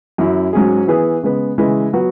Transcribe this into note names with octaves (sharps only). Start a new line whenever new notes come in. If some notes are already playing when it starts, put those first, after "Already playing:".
F#2 F#3 C#4 E4
G#2 F#3 C#4 G#4
E3 B3 G#4 B4
C#3 G#3 B3
C#3 E3 G#3 E4 B4
F#3 B3 F#4 B4